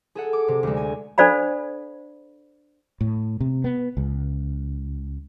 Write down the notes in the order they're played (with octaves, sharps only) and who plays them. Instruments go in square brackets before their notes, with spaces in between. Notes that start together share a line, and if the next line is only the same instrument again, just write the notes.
[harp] G#4 A4 F#5
D6
C3
D2 G#3
G#5
[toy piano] D4 A4 C5 D5 F5 B5
[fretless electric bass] A2
C3
B3
C#2